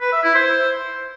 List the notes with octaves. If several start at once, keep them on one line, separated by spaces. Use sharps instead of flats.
B4
E5
E4
C5